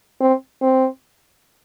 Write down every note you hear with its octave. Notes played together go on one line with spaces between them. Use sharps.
C4
C4